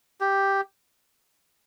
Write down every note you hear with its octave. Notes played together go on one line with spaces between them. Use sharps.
G4